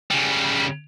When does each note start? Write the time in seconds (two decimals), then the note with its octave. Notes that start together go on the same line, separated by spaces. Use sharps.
0.11 C#3 G3